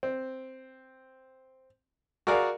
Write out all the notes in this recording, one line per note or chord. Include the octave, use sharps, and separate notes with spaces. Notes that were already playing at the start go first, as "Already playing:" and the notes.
C4
F#4 G#4 A#4 D5 F5